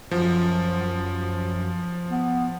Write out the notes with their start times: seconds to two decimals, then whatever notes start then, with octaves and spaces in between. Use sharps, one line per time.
0.11 F#2 F3
2.10 B3